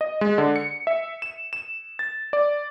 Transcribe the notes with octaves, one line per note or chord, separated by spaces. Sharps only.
D#5
G#3
D3
C#7
E5
E7
E7
A6
D5